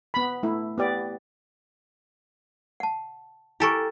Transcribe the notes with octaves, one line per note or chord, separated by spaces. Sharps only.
B3 B5
A3 E4
B3 G4 D5
F#5 A5
E4 G4 A4 A#4 G#5 C#6